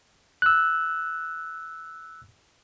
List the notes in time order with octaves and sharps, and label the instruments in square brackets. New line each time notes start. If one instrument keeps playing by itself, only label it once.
[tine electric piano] E6 F#6